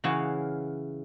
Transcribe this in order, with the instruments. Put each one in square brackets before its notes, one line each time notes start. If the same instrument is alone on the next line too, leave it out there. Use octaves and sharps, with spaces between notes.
[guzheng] C#3 E3 E4 F#4 C#5 F5